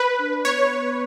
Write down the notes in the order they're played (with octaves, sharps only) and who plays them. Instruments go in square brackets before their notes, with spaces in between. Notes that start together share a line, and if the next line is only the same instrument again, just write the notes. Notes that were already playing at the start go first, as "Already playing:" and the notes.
Already playing: [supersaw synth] B4
[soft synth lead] D4
[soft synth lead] B3 [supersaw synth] C#5